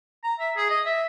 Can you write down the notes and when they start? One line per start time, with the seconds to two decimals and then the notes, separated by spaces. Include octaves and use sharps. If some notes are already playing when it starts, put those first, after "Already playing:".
0.24 A#5
0.39 E5
0.56 G#4
0.70 D#5
0.86 E5